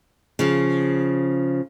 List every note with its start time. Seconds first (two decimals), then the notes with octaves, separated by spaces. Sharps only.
0.39 C#3 F3